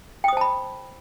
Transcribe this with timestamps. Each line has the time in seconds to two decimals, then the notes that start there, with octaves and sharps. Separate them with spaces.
0.24 G5
0.28 D#6
0.33 C5
0.37 A5
0.41 B5